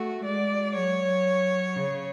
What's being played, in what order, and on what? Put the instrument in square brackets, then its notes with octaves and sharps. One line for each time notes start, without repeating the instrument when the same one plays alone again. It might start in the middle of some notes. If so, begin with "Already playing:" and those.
Already playing: [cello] A3 [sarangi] F#4
[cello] G#3 [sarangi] D5
[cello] F#3 [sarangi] C#5
[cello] C#3